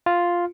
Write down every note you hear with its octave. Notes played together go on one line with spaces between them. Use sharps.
F4